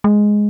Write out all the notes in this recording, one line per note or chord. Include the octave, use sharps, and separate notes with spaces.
G#3